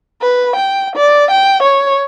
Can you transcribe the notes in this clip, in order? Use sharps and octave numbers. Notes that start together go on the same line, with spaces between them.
B4
G5
D5
G5
C#5